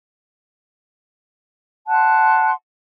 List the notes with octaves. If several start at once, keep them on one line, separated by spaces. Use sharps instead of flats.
F#5 A5 C6 F#6